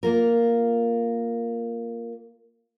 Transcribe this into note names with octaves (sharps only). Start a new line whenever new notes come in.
A#3 F4 A#4